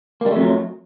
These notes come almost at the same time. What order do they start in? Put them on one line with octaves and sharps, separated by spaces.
A#3 G3 A3 F2 F#3